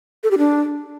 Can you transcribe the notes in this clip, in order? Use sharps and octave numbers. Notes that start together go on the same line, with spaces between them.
A4
G4
D4